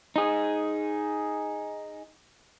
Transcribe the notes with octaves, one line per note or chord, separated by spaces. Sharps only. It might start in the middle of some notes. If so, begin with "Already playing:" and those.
D#4 G#4